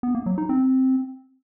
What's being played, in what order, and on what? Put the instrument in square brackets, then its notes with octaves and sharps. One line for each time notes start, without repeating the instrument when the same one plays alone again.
[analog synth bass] B3
A#3
F#3
D#4
C4